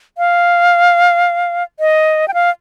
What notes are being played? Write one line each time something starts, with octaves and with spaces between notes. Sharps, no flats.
F5
D#5
G5
F5